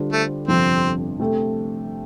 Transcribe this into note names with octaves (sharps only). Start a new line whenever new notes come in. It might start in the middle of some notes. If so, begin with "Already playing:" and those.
Already playing: D3 G3 D4 F4 C5
A3
G1 F2 C3 F3 C4
C3 A3 C4 A4